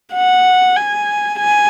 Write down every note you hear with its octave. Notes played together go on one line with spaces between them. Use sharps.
F#5
G#5
G#5